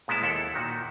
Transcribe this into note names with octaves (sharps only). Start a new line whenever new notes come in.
A#2 G#3 B3 C#4 E4 A5
D#2 E4 A4 F#5
A#2 D#3 F#4